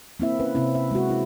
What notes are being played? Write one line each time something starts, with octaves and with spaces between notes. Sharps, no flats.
A#3 C4 E4 E5
C#4 B4
C3 C4 E4
E5
G#3 F#4
E4